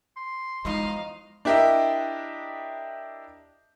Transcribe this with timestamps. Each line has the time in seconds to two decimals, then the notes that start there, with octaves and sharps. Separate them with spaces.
0.17 C6
0.65 E2 F3 G#3 D#4 D#5 F5
1.45 D4 E4 G4 A#4 D#5 E5